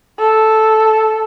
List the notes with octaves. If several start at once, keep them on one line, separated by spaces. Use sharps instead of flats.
A4